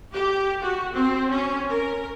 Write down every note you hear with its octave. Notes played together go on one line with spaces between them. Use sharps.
G4
F#4
C4
C#4
A#4